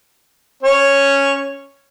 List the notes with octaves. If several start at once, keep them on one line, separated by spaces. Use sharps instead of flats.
C#4 C#5